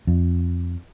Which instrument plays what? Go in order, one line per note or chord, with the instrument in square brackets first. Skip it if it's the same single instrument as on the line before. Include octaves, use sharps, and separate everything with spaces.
[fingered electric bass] F2